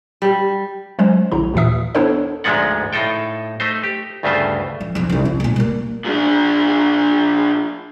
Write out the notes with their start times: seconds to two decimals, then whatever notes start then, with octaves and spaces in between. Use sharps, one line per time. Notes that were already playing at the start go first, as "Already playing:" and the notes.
0.22 G3
0.99 F#3 G#3 C#4 C5
1.32 A#1 D3 F3 E4 A#5
1.54 D#2 A#2 E3 E5 D#6
1.95 B3 D4 E4 A4 C5 C#5
2.44 D2 G#2 F3 G#3 D4 F#5
2.93 A2 D#4 F4 A4 G5
3.60 A3 D#4 C5
3.84 G4
4.23 D2 G2 C#3 A3 F4 C5
4.81 F3
4.95 B1 F2
5.10 C2 D#4
5.25 F4
5.40 D2 B2
5.56 G3 A#3
6.05 A#2 D4